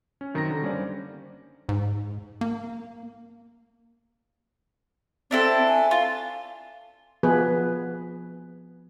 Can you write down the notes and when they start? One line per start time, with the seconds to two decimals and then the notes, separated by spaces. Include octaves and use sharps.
0.21 C#4
0.34 F#2 D#3 C4 A#5 G6 A#6
0.50 D3
0.62 G3 A#3 C#4 D4 C5 D5
1.69 G#2
2.41 A#3
5.31 C4 D4 E4 A4
5.68 G#5
5.91 F4
7.23 F3 B3 G#4 B4